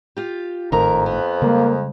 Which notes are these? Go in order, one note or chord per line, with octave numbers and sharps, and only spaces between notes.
F4 G4
G#1 F2 A2 D#3 A#4 E5 A#5
B3
C#3 G3 G#3 A#3